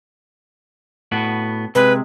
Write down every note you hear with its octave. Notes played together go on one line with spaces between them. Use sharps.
A2 B3 F#4
C3 G#3 B4